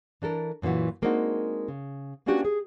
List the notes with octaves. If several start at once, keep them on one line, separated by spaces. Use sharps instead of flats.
E3 D4 A4 A#4
F#2 A#2 D#3 E3 F#4
G#3 A#3 C4 D4 D#4 F#4
C#3
A#3 B3 C#4 D4 F#4 G4
G#4